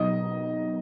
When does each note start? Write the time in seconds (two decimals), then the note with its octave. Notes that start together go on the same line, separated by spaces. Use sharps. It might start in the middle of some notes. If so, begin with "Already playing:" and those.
Already playing: B2 F#3 B3 D#4 D#5 D#6